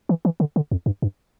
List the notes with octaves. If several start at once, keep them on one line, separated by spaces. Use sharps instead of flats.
E3
E3
D3
D3
F2
G2
G2